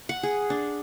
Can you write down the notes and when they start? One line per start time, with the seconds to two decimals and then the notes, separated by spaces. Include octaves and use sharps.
0.09 F#5
0.23 G#4
0.50 D4